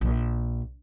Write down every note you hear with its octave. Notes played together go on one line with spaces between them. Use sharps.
A#1